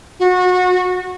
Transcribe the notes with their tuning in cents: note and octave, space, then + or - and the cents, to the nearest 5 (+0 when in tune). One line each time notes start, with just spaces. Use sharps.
F#4 -30